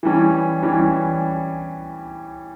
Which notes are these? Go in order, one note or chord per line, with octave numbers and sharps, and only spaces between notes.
E3 G3 C#4
E3 G3 C#4